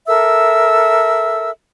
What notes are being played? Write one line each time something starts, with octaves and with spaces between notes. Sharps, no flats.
A4 A#4 E5 E6